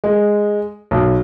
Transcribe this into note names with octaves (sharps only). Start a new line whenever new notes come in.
G#3
B1